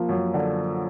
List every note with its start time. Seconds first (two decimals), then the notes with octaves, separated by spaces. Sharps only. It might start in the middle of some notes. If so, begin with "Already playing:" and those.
Already playing: F3 A#3
0.09 F#2
0.34 D3